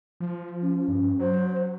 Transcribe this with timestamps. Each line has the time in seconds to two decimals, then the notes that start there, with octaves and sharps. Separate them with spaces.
0.20 F3
0.62 C#4
0.88 G2
1.19 F#3 C5